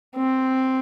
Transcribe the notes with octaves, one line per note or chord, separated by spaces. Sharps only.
C4